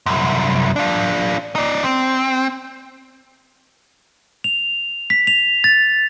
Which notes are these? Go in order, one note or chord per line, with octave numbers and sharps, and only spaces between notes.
C2 F#2
D4 F4
D#4 D5
C4
F7
B6
F7
A6